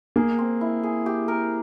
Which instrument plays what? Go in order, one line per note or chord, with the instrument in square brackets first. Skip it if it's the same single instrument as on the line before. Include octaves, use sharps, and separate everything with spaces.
[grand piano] A#3 [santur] G#4
[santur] C4
E4
G#4
G4
A#4